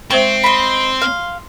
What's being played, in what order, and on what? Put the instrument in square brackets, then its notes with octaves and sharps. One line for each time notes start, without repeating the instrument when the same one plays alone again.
[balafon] G#3 C5 G5 [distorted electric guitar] C4 [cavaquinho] C#6
[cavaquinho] D#5 B5 [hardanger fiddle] C6
[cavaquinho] F5